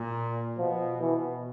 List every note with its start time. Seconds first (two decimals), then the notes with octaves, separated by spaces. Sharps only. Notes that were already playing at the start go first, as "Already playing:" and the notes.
Already playing: A#2
0.58 B2 F3
1.01 B2 E3